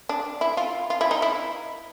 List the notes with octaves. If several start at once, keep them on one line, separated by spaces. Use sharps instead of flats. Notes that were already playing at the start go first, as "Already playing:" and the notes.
D4
E4
F4
F4
E4
D#4
E4